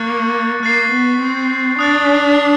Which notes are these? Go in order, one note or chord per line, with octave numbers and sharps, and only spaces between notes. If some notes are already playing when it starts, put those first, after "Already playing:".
Already playing: A#3 C#6 F#6 A6 C#7
A#3 F#6 A6 C7
B3
C4
D4 D#6 F#6 A6